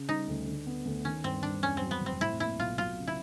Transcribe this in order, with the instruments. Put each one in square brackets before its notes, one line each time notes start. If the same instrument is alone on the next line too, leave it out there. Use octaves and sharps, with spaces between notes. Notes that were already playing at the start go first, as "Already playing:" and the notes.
Already playing: [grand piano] C#3
[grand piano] G3 [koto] D#4
[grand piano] D2
D3
B3
D2
[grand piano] D#3 [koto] C#4
[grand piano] G2 [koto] C4
[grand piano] G2 [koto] D4
[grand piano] E2 [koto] C#4
[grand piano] F#3 [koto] C4
[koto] B3
[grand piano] F1
[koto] C4
[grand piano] A2 [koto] E4
[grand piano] A#3 [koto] E4
[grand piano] B1 [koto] F4
[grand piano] F#3 [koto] F4
[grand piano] C#3
[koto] E4